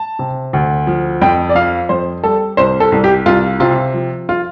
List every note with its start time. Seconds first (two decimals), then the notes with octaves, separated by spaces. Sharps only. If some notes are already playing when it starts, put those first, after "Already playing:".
Already playing: A5
0.19 C3
0.53 D2
0.87 F3
1.22 F2 G5
1.49 D5
1.55 F3 F5
1.89 F2 C5
2.24 G3 A4
2.57 C2 C5
2.80 A4
2.92 C2
3.04 G4
3.26 C2 F4
3.60 C3 F4
3.94 F3
4.29 F4